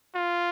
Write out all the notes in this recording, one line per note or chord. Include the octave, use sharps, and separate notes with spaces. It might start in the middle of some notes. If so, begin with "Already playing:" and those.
F4